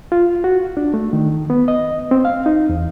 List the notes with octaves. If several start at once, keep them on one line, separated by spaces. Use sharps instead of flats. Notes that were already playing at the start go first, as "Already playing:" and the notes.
F4
F#4
D4
A3
D#3
B3
D#5
C4
F5
D#4
E2